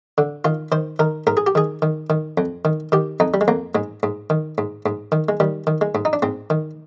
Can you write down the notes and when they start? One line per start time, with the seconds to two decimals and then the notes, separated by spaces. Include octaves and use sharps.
0.18 D3
0.45 D#3 F4
0.72 D#3 C5
0.99 D#3 A#4
1.27 G#2 A#4
1.37 G#4
1.47 G4
1.55 D#3 G#4
1.82 D#3
2.10 D#3
2.38 F2
2.65 D#3
2.92 D#3 G4
3.20 F2 D#4
3.34 G3
3.41 G#3
3.48 F2 A#3
3.75 G#2 G#3
4.03 G#2
4.30 D#3
4.58 G#2
4.86 G#2
5.12 D#3
5.29 G#3
5.40 D#3 G3
5.67 D#3
5.81 G#3
5.95 G#2
6.05 D#4
6.13 D4
6.22 G#2 C4
6.50 D#3